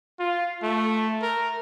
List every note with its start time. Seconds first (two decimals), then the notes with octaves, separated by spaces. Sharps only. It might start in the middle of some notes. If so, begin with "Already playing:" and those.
0.20 F4
0.63 A3
1.22 A#4